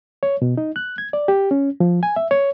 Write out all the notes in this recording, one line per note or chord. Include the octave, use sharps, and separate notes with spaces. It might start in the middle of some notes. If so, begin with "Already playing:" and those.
C#5
B2
D#4
F#6
G#6
D5
G4
C#4
F3
G#5
E5
C#5